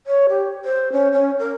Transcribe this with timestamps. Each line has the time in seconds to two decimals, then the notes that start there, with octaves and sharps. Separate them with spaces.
0.07 C#5
0.29 G4
0.65 C5
0.92 C#4
1.12 C#4
1.39 A#4